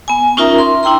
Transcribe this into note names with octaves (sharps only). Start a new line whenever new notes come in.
B3 G#5
C#4 D#4 F4 A#4 E5 A#5
C6
D4 E4 G5 A#5 C6